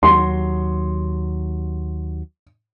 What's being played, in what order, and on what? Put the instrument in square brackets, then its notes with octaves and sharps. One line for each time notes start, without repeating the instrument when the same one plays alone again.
[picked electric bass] D#2 F#3 [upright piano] C6